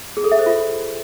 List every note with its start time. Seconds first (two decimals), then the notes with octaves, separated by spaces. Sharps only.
0.17 G#4
0.24 A4
0.32 E5
0.39 C5
0.46 F4